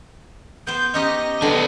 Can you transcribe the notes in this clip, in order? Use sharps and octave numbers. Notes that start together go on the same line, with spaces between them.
B3 C5 G6
C#4 D#4 G4 D#5
D3 B3 D4